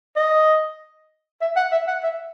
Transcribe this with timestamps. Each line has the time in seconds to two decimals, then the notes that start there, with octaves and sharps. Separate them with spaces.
0.16 D#5
1.41 E5
1.56 F#5
1.72 E5
1.88 F#5
2.03 E5